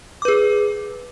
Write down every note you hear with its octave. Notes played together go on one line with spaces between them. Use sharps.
G#4 B4 D6